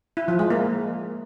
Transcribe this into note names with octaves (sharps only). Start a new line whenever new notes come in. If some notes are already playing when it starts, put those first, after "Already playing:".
E4
F3
G#3
A#3